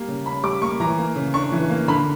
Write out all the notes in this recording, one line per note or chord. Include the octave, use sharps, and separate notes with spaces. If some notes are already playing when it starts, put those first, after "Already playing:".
Already playing: G3 A#3
C#3
C#4 B5
G3 D6
A#3 C#6
E3 A#5
A#3
C#3
D4 C#6
E3
A#3
D3 B5